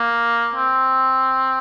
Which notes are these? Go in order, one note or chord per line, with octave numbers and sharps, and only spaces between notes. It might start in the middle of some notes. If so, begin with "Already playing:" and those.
Already playing: A#3
C4